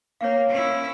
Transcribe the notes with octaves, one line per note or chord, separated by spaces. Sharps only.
A#3 C#5 F5
C#4 E4